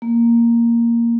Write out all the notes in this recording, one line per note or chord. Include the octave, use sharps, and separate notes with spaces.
A#3